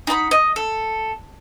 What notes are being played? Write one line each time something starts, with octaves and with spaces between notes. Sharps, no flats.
D#4 F#5 A5 B5
D#5
A4